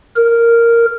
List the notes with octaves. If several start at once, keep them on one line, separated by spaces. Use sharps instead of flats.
A#4